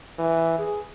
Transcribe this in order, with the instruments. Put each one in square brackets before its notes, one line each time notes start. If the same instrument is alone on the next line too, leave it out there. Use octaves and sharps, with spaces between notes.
[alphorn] E3
G#4